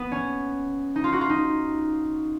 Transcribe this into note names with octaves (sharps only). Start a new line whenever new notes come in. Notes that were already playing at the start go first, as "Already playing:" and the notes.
Already playing: B3
C#4
D#4
F4
F#4
F4
D#4